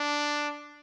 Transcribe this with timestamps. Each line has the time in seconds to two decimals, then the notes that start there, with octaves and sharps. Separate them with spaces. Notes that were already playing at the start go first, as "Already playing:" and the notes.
Already playing: D4